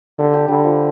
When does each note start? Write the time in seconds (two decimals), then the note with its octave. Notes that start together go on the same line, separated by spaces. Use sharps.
0.18 D3 D4 G4
0.33 D4 G4
0.48 D3 G3
0.64 F3